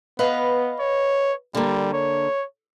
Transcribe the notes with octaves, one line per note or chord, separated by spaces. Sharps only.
B3 B4 D#5 F5
C#5
D3 G3 A#3
C#5